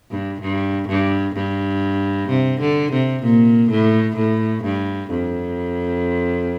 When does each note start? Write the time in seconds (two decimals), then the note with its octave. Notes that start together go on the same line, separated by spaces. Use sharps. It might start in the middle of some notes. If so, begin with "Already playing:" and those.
0.11 G2
0.41 G2
0.89 G2
1.35 G2
2.29 C3
2.61 D3
2.92 C3
3.23 A#2
3.70 A2
4.16 A2
4.63 G2
5.10 F2